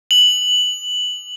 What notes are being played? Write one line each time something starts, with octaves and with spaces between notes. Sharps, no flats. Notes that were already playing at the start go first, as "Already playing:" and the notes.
F#7